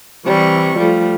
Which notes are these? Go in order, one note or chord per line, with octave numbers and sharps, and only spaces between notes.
C3 E3 G3 C#6
F3 G3 A3